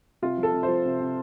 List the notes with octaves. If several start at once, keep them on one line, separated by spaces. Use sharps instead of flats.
C3 F4
F3
A4
C3
C5
F3
C3
C3